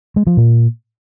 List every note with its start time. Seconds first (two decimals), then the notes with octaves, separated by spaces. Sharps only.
0.16 G#3
0.27 F3
0.37 A#2